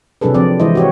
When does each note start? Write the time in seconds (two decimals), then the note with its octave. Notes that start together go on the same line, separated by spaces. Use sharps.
0.21 C3 F#3 D4 G#4 A4 B4
0.34 F3 C4 D5
0.60 E3 G#3 E4 C5 D#5
0.75 F#4 G4 C#5